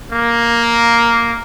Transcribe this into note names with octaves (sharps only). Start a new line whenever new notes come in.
A#3